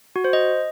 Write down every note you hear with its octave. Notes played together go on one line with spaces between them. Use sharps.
F#4
C5
D#5